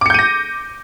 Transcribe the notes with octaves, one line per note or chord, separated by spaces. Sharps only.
D6 G6 A#6 C#7 D#7